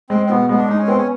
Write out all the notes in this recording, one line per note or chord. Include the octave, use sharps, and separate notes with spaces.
G#3 C4
C4
B2 B3
G#3 B3
D4
G#3 D#4
C#4
B3 C4
C#4